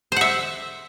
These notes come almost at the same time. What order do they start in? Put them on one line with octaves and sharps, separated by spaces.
C5 F#5 E5